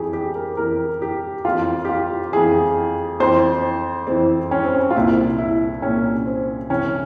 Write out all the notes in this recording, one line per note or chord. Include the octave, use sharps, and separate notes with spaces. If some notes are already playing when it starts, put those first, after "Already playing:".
Already playing: F2 E3 G4 G#4
G4
A#4
F2 E3 A#4
G4
F2 E3 F4
G4
F4
F2 E3 G#4
F2 E3 C5
F2 E3 C4
C#4
C4
C#4
F4
C2 A#2 E4
E4
C2 A#2 C#4
C4
C2 C3 E3 C#4